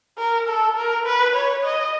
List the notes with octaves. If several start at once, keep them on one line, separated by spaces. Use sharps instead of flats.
A#4
A4
A#4
B4
C#5
D#5